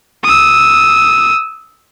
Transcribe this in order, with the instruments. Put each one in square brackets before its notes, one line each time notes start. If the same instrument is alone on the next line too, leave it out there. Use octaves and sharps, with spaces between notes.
[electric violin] D#6 E6